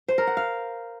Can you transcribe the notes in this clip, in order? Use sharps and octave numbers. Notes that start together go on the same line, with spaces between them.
C5
A#4
F#5
F5